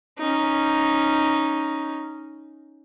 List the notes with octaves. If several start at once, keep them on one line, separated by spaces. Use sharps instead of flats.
C#4 D#4